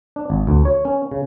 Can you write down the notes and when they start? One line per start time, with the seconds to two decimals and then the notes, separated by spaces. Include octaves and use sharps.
0.16 D4
0.30 G#1
0.47 D2
0.65 C#5
0.85 C#4
1.11 C#3